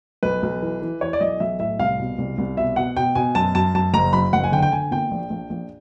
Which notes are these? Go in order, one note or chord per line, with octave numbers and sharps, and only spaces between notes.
B1 B4
B1
E3
E3
E3 C#5
D5
B1 D#5
B1 E5
A2 E5
C2 F5
B2
C2
C2
B2 E5
B2 F#5
B2 G5
B2 G#5
F#2 A5
F#2 A5
F#2 A5
F#1 A#5
F#2 B5
F#1 F#5
G#5
D3 G5
G5
D3 G#5
A#2 G5
A#1
A#1
A#1